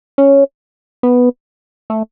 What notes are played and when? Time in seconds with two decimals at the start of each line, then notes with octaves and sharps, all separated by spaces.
0.18 C#4
1.03 B3
1.90 A3